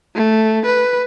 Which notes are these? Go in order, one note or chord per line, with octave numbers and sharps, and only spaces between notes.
A3
B4